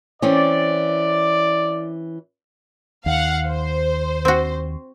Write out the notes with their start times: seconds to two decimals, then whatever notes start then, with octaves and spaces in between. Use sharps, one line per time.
0.22 E3 C4 C#4 D5
3.06 D#2 F5 F#5
3.48 C5
4.25 C4 F#4